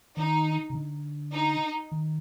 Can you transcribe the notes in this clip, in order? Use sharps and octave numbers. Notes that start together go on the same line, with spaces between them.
D#3 D#4
C3
D3
D#4
D#3